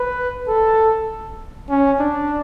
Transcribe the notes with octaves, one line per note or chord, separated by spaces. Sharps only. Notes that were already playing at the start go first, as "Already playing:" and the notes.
Already playing: B4
A4
C#4
D4